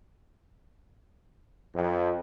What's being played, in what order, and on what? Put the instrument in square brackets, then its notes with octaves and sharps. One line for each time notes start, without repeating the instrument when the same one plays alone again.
[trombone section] F2